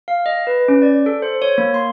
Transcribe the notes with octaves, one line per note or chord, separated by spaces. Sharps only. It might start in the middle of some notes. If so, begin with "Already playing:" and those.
F5
D#5
B4
C#4
D5
A4
C5
C#5
A#3
C6